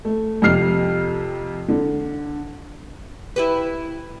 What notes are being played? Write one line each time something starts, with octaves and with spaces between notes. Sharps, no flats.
A3
F2 C3 F6 C7
D3
E4 G4 B4